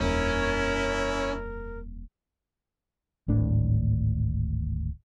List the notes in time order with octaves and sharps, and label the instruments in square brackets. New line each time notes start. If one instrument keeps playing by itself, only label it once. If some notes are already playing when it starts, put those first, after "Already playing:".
[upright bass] D#1 F2 [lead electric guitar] C#4 [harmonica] E4 [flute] A#4
[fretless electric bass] D1 G#1 A2 D4